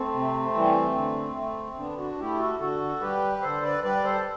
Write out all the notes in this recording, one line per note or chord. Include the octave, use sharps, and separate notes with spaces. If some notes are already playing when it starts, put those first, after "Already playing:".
Already playing: A3 C4
C3
E3 G3
D3
A3
D3 B3 D4
D4 F#4
A3 E4 G4
F#4 A4
D3 F#4 A4
G3 G4 B4
D3 A4 C5
B4 D5
G3 B4 D5
A4 C5